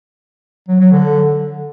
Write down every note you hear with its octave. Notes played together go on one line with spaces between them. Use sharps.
F#3
F#3
D3